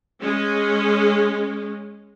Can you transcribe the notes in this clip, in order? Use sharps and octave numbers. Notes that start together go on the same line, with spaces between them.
G#3 C#4